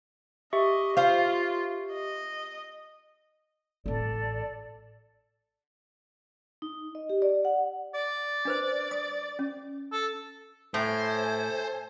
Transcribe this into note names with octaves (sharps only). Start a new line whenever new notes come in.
G4 D#5 E5 C#6
F4 C5 F5
D#5
A1 C4 A4 D5
D#4
D#5
G4
D5
F#5
D5
D4 B4 C5
D#6
C#4
A4
A2 A4 C5 C#5 E5 G#5